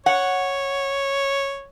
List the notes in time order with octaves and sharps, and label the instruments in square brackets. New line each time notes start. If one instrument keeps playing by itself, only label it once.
[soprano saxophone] C#5 [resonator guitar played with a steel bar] F#5